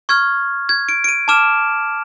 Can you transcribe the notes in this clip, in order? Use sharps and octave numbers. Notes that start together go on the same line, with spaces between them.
C#6 F6 G#6
G#6
D7
D7
D#7
A5 D6 F6 E7